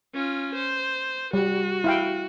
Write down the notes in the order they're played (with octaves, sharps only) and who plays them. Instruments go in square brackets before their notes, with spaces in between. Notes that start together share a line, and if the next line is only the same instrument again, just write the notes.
[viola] C#4 F4
C5
[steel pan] G3 [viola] F#4
[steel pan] E4 F5 G5